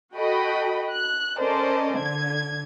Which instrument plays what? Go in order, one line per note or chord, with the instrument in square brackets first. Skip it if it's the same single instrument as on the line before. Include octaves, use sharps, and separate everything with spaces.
[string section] F#4 A4 D#5 G5 B5
F#6
C#4 A4 A#4 C5 D5 D#5
D3 G#6